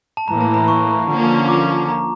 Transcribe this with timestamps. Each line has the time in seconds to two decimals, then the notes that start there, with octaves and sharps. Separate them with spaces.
0.17 A5
0.28 A2 E3 A#3 A#5
0.41 A5
0.54 A#5
0.68 C#6
1.08 D3 F3 A#3 C#4
1.48 D6
1.89 A#5